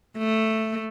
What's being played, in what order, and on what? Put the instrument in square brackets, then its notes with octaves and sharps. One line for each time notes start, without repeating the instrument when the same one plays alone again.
[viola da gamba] A3